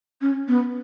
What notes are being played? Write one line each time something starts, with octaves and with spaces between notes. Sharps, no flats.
C#4
B3